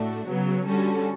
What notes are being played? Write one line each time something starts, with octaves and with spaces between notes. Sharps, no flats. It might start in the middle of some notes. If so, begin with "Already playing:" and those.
Already playing: A2 A3 D4 F#4
C#3 F#3 B3
D3 G3 C#4 F#4 A4